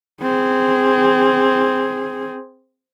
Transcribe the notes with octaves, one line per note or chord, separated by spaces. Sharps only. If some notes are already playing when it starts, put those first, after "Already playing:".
C4 G#4